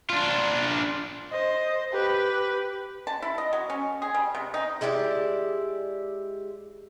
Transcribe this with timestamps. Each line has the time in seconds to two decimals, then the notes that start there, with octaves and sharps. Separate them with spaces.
0.10 D4 F4
1.31 C5 D#5
1.92 G4 B4
3.07 A5
3.22 E4
3.38 D#5
3.53 F#3
3.70 C#4
4.02 G#4
4.15 G3
4.35 C3
4.54 D#4
4.81 G#3 E4 G4 D5